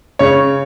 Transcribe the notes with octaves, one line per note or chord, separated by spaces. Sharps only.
C#3 C#5